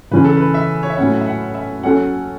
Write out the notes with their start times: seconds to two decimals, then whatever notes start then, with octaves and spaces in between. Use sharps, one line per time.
0.11 C#3 E3 C#4 B4
0.24 A4
0.37 B4
0.54 E5
0.83 C#5
0.90 E5
0.98 A2 F#3 C#4 F#5
1.21 E5
1.26 F#5
1.55 E5
1.83 F#3 C#4 A4 F#5